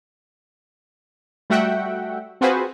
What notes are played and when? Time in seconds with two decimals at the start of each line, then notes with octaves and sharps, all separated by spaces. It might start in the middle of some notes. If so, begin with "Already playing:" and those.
1.50 G3 A3 F#4 E5 F#5 G5
2.41 C4 F4 F#4 G#4 B4 C5